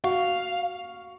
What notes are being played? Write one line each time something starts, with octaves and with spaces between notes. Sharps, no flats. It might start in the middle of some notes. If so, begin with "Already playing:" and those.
F#4 F5